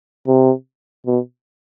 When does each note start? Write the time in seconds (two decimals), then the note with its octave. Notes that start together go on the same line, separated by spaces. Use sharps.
0.28 C3
1.07 B2